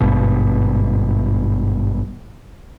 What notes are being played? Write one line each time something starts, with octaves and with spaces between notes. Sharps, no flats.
G#1 G2 B2